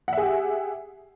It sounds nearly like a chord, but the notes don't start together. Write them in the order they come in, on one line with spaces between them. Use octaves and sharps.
F#5 E5 G#4 G4